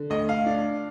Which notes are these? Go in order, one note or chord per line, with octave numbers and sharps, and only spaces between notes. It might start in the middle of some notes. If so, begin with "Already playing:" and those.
Already playing: D3
D2 D#5
F5
D4